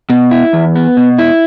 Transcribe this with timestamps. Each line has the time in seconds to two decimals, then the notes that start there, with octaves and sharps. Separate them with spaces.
0.10 B2
0.31 E4
0.53 E2
0.76 B3
0.97 B2
1.19 E4